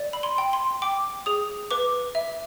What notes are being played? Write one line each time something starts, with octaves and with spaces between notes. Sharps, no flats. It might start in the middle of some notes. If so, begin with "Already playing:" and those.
Already playing: D5
B5
C6
G5
C6
G5 D6
G#4 D#6
B4 D6
E5